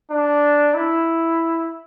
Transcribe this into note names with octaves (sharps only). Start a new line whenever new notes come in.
D4
E4